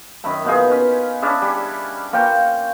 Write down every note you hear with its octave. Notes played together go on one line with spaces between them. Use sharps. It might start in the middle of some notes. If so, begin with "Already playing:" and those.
F#2 D#3 E4 B5
B2 D#4 F4 G#4
C#4 B4
C#4 D4 E4 G#4
G3
A#3 F4 C#5 G5